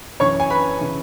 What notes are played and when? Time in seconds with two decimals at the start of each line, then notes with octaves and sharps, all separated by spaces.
0.20 F#2 E3 C#5 C#6
0.40 G#5
0.50 B4 B5
0.81 C#3 E3